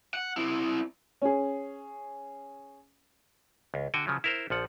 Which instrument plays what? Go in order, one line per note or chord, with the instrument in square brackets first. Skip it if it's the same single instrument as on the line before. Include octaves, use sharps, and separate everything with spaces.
[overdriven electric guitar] F#5
C4 E4
[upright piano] C#4 G#4
[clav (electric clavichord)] C#2
D3 F#4 G5 G#5
C#3 F3 F#3
E4 A#4 C5
A#1 F3 F#5